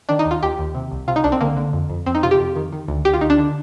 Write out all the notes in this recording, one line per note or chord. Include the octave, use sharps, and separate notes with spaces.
D#3 D4
D#4
D#2
F4
D#2 G4
D#2
C3
C2
C3 F4
D#4
C2 D4
C4
D3 A#3
D3
F2
F2
F2 C4
D#4
C3 F4
G4
F2
D#3
D#3
D2
D2 G4
F4
D2 D#4
D4
D3